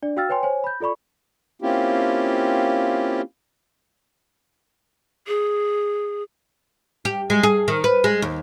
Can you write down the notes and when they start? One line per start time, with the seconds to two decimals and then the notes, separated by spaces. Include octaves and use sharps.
0.02 D4 D5
0.17 F#4 F5 G5 E6 F6 A6
0.29 B4 C#5 G5 G#5 C6
0.43 C5 C#5 G#5
0.64 B5 G6
0.80 F4 A4 D5 B5 C#6
1.62 A#3 C4 C#4 E4 F4 G4
5.27 G#4
7.05 G4
7.30 G#3
7.43 G#4
7.68 D#3
7.84 B4
8.04 G#3
8.22 D#2